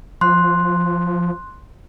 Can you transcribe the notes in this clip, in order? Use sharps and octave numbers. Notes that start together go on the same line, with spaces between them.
F3 C6 F#6